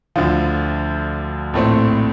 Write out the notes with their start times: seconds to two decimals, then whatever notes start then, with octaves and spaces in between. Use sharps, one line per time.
0.16 D2 D3 F3
1.54 A#1 A2 A3 C4